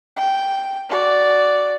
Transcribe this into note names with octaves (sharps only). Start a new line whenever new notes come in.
G5
F#4 D5